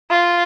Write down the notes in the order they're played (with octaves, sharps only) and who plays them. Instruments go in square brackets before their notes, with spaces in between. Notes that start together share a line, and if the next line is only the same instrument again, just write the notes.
[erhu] F4